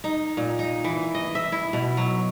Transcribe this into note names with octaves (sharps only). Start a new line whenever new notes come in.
D#4
A#2
D#4
E3
D#5
E5
E4
B2
F#3